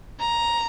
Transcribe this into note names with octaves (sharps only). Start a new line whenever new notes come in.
A#5